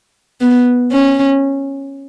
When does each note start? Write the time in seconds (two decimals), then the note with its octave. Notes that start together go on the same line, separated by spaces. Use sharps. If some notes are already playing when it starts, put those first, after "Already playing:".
0.41 B3
0.92 C#4